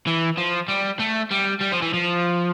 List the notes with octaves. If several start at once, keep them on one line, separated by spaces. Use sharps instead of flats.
E3
F3
G3
A3
G3
G3
F3
E3
F3